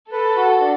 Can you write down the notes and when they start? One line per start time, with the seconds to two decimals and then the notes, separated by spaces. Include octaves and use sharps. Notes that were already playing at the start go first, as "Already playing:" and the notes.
0.11 A4 B4
0.36 F#4
0.61 D4